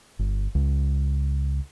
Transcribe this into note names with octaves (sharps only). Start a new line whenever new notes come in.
G1
C#2